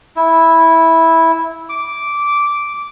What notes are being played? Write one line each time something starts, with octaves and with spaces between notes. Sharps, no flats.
E4
D6